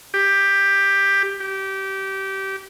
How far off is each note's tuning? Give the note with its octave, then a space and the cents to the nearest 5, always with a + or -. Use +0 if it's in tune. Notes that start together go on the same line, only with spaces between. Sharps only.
G4 +10
G4 -20